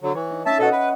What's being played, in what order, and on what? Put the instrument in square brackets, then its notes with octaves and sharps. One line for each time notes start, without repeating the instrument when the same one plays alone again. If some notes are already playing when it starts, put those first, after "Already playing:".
[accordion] D3 F#3
[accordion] E3 [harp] C#5
[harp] D#4
[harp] C#4 D#4 [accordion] E5 A5
[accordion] B2 A4 [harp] D#5 E5 F#5
[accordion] B4